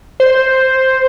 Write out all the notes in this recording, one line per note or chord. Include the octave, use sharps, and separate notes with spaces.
C5